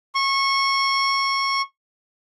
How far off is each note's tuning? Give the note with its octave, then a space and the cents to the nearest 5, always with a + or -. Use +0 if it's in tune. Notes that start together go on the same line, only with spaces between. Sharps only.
C#6 -20